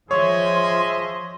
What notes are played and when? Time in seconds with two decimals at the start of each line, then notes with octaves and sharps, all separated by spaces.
0.11 F3 G#4 C#5 D#5 E5 C6